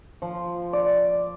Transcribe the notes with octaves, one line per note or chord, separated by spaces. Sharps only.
F3
D5